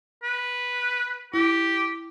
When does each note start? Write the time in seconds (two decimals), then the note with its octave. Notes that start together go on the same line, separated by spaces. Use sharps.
0.23 B4
1.34 E4 G4